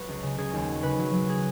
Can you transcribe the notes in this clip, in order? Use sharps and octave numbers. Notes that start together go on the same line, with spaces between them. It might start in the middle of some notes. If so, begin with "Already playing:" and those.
Already playing: F#3 B4
C#2
C#3
C#3 G#4
D#2
F#3
C#3 B4
F#3
F#3
G#4